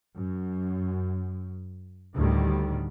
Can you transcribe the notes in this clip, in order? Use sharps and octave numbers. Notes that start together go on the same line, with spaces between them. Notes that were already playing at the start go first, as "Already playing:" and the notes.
F#2
D2 A2 D#3 G3